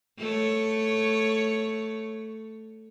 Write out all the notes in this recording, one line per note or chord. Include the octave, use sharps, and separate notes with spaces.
A3 C#5